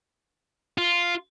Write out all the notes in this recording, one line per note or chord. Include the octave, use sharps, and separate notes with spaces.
F4